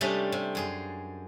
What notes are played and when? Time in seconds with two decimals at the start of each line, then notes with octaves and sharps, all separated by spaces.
0.01 C3 G3 A3 C#4 D4 D#5
0.32 C3
0.55 F#2 G#4 C6